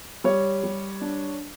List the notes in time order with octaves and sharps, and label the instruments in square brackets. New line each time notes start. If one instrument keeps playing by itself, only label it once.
[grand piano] G3 C#5
G3
D4